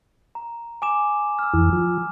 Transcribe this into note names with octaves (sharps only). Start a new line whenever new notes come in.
A#5
G#5 D6 E7
E6 F6
F2 E3
F3